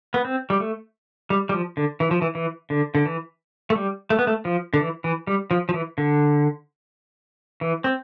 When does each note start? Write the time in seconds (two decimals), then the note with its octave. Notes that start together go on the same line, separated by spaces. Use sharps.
0.14 B3
0.25 C4
0.50 G3
0.60 A3
1.30 G3
1.49 G3
1.54 F3
1.77 D3
2.00 E3
2.11 F3
2.22 E3
2.35 E3
2.70 D3
2.95 D3
3.06 E3
3.70 A3
3.76 G3
4.10 A3
4.19 B3
4.27 A3
4.45 F3
4.74 D3
4.81 E3
5.04 E3
5.27 G3
5.51 F3
5.69 F3
5.74 E3
5.98 D3
7.61 E3
7.84 C4